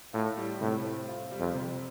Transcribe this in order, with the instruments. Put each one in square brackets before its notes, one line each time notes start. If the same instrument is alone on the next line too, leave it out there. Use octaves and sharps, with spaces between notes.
[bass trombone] A2 [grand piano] F4
[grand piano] G3
[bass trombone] A2 [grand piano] C3
[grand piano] C4
F4
G3
[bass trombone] F2
[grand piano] C3